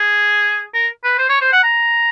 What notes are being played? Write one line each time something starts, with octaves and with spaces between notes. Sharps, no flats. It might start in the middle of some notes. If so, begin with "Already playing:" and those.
Already playing: G#4
A#4
B4
C5
C#5
C5
F#5
A#5